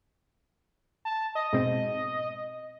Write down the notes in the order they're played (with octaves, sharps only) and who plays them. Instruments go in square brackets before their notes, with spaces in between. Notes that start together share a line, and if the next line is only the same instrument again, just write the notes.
[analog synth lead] A5
D#5
[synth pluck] G#2 B2 C4